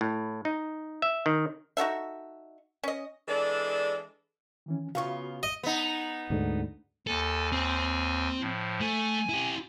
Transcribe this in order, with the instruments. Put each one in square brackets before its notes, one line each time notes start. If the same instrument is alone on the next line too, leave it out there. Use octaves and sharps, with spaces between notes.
[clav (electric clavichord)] A2
D#4
E5
D#3
[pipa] D#4 F#4 A4 E5
C#4 D#5
[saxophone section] E3 G#3 D4 A4 D5
[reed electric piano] D#3 E3 C#4
[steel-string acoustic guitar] C#3 B3 F4 [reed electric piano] F#4 [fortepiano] F5 C#6
[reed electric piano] A2 [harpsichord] D#5
[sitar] B3 D#4
[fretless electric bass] D2 G#2 D3
[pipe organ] D#2 G#5 [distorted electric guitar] A4
[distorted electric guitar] C4
[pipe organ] A2 F3
[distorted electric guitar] A3 [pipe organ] G#5
[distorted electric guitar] E4 G4